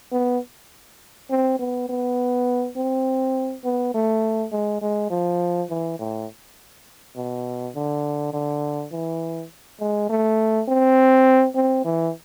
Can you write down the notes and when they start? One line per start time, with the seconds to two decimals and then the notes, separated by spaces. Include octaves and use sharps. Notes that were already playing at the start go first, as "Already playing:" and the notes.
0.12 B3
1.30 C4
1.59 B3
1.89 B3
2.76 C4
3.64 B3
3.94 A3
4.52 G#3
4.82 G#3
5.10 F3
5.70 E3
6.00 A2
7.16 B2
7.75 D3
8.33 D3
8.92 E3
9.80 G#3
10.10 A3
10.68 C4
11.55 C4
11.85 E3